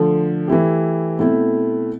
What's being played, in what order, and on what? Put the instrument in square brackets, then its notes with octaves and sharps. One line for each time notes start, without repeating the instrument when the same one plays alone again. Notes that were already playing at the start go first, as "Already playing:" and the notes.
Already playing: [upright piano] D3 F3 A3
E3 A3 E4 G4
B2 A3 C4 E4 A4